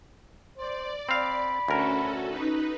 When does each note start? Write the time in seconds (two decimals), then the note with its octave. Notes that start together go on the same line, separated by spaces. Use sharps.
0.57 C5 D5
1.09 C4 F5 B5
1.68 D2 C#4 F#4 A4 A#4
2.27 D#4 B4